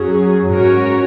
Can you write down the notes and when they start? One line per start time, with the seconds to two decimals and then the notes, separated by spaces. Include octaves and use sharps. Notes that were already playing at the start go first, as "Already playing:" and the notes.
Already playing: F#2 F#3 C#4 G#4
0.49 G#2 C#4 F#4 A#4 C#5